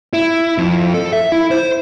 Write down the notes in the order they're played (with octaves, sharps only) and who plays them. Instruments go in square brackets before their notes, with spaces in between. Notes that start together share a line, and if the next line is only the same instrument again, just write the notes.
[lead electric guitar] E4
F2
A4
E5
E4
C5